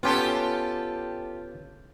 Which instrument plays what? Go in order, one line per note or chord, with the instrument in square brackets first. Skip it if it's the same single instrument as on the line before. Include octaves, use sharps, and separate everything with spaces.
[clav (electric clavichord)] B3 C#4 [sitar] F4 G4 A4